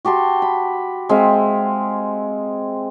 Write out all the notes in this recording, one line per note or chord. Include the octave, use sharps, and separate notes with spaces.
F#4 G4 A5 C6
B5
G#3 C4 E5 F5